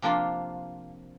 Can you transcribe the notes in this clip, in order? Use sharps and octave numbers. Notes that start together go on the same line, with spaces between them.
C3 F3 A#3 D4 F4